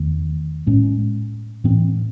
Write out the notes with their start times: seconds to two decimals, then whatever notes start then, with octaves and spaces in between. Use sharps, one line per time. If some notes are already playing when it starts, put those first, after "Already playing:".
Already playing: E2 D#3 A3
0.67 A2 G#3 C#4
1.64 A2 E3 C4